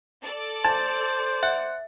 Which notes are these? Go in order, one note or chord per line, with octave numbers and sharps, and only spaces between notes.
A4 D5
C5 A5
E5 F#5